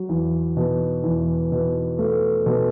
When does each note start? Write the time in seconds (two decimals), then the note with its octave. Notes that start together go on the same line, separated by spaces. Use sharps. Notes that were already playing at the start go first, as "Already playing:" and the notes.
Already playing: F#3
0.09 E2
0.57 B2
1.03 E2
1.52 B2
1.99 A3
2.46 B2